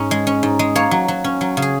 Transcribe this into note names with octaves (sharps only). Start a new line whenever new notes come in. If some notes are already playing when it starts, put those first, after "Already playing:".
Already playing: G#2 C#4
G#3
C#4
G#2
G#3
A#3 C#5
F#3
F#3
C#4
F#3
C#3
G#4